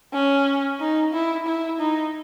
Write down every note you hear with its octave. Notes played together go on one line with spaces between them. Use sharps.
C#4
D#4
E4
E4
D#4